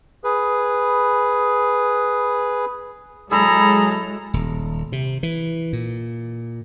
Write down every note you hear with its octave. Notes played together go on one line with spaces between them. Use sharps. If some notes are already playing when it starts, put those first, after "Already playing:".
G#4 B4
F#3 G#3 E4 G#4 A4 A#5
D#1
C3
E3
A#2